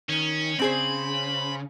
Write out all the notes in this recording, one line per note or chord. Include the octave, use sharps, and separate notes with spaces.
D#3 C#4
C#3 C4 G#4 C5 B5